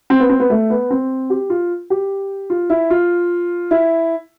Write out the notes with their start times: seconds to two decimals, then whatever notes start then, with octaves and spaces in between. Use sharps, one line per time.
0.10 C4
0.20 B3
0.29 C4
0.40 B3
0.50 A3
0.70 B3
0.90 C4
1.30 G4
1.50 F4
1.90 G4
2.50 F4
2.70 E4
2.90 F4
3.71 E4